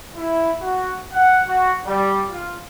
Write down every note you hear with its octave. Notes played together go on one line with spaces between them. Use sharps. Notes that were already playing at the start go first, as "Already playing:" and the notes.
E4
F#4
F#5
F#4
G3
F4